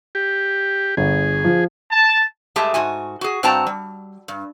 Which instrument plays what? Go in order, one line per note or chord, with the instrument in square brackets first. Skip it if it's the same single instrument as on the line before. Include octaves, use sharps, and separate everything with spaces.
[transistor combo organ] G4
[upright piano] G1 [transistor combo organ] G#4
[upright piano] F3
[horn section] A5
[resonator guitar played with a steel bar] G2 G#3 A3 G4 G#4 A5
G#2 F#4 G#5
F#4 G#4
G2 C4 F#4 G5 A5 A#5
G3
G2